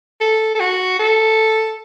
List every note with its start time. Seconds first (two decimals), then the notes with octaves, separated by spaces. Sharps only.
0.21 A4
0.55 A4
0.60 F#4
0.99 A4